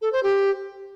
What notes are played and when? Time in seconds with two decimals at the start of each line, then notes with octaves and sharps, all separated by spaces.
0.02 A4
0.12 C5
0.23 G4